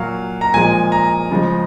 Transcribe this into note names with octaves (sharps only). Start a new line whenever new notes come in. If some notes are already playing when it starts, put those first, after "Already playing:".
Already playing: A#2 F#3 F5
A#5
A#2 F3 G#3 G#5
A#5
C#3 F3 G#3